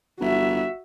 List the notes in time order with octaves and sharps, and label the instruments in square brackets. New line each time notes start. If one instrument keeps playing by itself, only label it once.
[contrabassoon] G1 [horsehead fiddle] F#4 E5